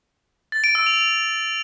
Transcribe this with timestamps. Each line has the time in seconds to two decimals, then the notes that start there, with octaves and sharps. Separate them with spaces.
0.52 A6
0.64 D7
0.75 E6
0.86 F7